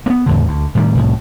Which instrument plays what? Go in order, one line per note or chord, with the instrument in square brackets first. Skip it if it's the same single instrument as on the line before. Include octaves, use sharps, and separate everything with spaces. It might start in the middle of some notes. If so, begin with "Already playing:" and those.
[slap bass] A#3 B3
E2 A2 D3
D2
A2 D#3 F#3 G3
C2 A2